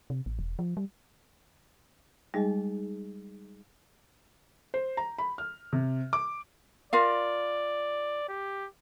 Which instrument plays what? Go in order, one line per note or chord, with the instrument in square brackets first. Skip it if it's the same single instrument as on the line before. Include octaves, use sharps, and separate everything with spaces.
[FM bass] C3
A1
E1
F3
G3
[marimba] G3 G#3 [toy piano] D#4 G#4 D#5
[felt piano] C5
A#5
B5
F6
C3
D6
[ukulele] F4 A#4 F5 [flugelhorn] D5
[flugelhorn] G4